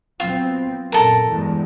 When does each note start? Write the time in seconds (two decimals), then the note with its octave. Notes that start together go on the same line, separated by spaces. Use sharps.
0.20 F#3 B3 C4 F4
0.92 F#2 A#2 A4 A#4
1.28 E2 G2 G#3